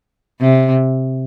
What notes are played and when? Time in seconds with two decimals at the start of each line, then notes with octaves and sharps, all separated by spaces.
0.41 C3